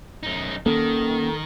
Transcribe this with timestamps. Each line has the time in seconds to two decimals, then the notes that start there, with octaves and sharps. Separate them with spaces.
0.23 F#2 D#4
0.66 D#3 A#3 C#4 A4